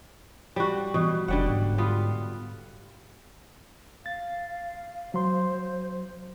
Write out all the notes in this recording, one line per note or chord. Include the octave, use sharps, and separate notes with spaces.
G3 F#4
B2 E3
F1 D3 G3 F#5
G#2
G3 B3 F4
F5 A6
F#3 C5 C6